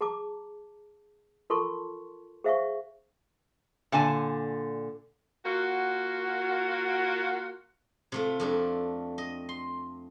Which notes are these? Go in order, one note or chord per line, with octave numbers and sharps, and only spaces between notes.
G#4 A5 A#5 D6
F4 A4 A#4 A5 C6 C#6
G#4 C5 E5 F5 G#5 C#6
A#2 D3 G#5 A5
A#3 F4 F#4
C3 A3 F4
F2 A3 D4
D#5
C6